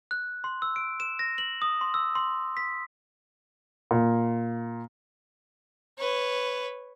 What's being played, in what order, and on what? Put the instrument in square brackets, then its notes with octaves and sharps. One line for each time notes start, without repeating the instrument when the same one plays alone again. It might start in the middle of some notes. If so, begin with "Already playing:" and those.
[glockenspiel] F#6
C6
E6
D7
E7
A#6
F#7
D#6
C6
E6
C6
B6
[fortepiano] A#2
[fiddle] B4 C#5